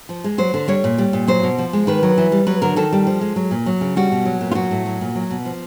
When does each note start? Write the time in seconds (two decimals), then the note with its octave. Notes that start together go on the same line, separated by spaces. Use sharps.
0.09 F3
0.24 G#3
0.38 F#3 C5
0.54 D3
0.68 G3 C#5
0.84 A#2
0.98 G3
1.13 A#2
1.28 F#3 C5
1.43 B2
1.58 F3
1.73 G#3
1.87 D#3 B4
2.03 F#3
2.18 E3
2.32 G3
2.47 F#3 B4
2.62 D3 A#4
2.76 D#3 A4
2.93 G3
3.07 F3
3.21 G#3
3.36 F#3
3.51 A#2
3.66 F#3
3.81 C#3
3.96 G3 F#4
4.12 B2
4.25 F#3
4.41 A#2
4.51 F4
4.55 F#3 F#4
4.71 A2
4.86 F#3
5.01 A#2
5.15 F#3
5.31 B2
5.45 F3